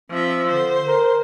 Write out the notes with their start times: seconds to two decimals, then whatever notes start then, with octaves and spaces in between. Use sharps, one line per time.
0.10 F3 C4 E5
0.48 D3 C5
0.87 A#4